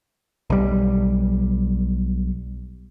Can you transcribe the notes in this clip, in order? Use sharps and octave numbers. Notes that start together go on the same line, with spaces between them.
B1 G3